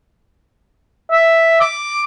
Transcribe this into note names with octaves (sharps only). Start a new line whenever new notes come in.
E5
D6